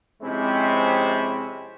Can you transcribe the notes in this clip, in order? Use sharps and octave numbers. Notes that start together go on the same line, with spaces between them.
F2 C3 G#3 C4 C#4 E4